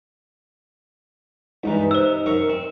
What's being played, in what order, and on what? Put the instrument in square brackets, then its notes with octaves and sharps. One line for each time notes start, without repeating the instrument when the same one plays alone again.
[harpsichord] C#2 G2 E3 [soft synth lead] D#4
[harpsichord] C3 [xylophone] C5 E6
[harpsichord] F#2 A#4 C#6
C4